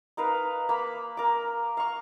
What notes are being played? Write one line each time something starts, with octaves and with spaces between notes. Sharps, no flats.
D#4 A#4 B4 F5
A#3 B5
A#4 D6
F5 C#6